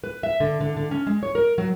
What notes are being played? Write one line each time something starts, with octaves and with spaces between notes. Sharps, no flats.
B4
E5
D3
D3
D3
C#4
G#3
C#5
A#4
F#3